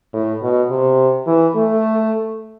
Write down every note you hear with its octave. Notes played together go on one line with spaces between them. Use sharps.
A2
B2
C3
E3
A3